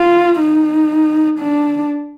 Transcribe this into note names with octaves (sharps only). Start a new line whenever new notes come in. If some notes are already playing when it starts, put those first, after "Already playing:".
Already playing: F4
D#4
D4